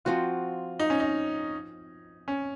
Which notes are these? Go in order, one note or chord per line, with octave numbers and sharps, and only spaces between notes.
F3 C4 F4 F#4
D#4
C#4
D#4
C#4